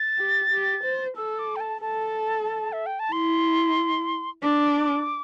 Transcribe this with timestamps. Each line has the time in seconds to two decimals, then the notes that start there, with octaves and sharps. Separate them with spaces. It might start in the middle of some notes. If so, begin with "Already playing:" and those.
Already playing: A6
0.18 G4
0.51 G4
0.84 C5
1.17 A4 E6
1.39 D6
1.56 G5
1.60 A5
1.82 A4 A5
2.73 E5
2.86 G5
2.99 A5
3.12 E4 C6
4.43 D4 D6